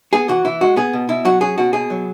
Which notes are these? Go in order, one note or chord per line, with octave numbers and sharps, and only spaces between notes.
B3 G#4
E3 F#4
E3 E4
G#3 F#4
B3 G#4
B2
B2 E4
F#3 F#4
C#4 G#4
B2 F#4
B2 G#4
F#3